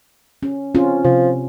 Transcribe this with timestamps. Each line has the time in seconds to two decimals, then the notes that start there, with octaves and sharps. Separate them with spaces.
0.43 C#4
0.75 C4 C#4 F4
1.05 C3 F3